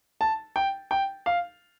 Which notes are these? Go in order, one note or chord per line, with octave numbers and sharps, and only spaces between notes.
A5
G5
G5
F5